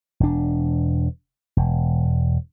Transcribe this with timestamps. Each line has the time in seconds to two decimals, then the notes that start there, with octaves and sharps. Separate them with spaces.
0.20 E1 D4
1.57 E1